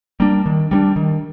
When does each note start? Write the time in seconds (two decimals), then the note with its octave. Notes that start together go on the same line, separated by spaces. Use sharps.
0.20 G3 A#3 D4
0.46 D#3
0.71 G3 A#3 D4
0.96 D#3